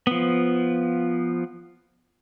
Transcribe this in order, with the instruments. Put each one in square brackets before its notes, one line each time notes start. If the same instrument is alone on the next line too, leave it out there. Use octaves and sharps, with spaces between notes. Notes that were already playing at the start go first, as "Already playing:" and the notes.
[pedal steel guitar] F3 B3